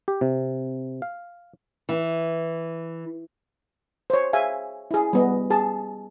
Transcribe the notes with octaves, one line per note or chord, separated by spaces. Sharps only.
G4
C3
F5
E3
C5 C#5
G#4 E5 F5 G#5
E4 G#4
G3 B3 D#5
G#4 A5